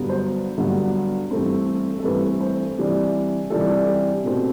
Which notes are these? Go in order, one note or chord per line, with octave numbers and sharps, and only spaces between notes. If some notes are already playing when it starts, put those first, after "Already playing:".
Already playing: G2 D3 F#3 B3
C5
G2 D3 F#3 B3
G2 E3 A3 C4
A4
G2 E3 A3 C4 B4
C5
C3 E3 G3 D4
C3 E3 G3 D4 A4
G4
B2 A3 C4